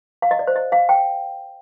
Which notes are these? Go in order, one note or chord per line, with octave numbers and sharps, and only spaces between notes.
F5
D#5
D5
C5
D#5
F5
G5